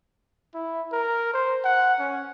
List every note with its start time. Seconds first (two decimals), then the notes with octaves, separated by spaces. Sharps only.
0.54 E4
0.92 A#4
1.34 C5
1.64 F#5
1.99 C#4